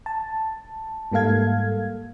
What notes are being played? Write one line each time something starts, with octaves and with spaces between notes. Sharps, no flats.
A5
G#2 G3 A#3 A4 F5 G#6